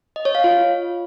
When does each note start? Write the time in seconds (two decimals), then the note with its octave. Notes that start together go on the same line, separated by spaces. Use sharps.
0.16 D#5
0.25 C#5
0.35 F5
0.44 F4